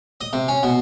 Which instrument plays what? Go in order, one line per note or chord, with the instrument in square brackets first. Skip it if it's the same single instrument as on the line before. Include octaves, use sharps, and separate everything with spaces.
[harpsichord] D#5
C3
C#4
B2